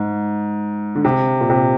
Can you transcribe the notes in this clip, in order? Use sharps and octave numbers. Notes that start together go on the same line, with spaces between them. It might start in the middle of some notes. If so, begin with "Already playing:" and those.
Already playing: G#2
D3
C3
A#2
C3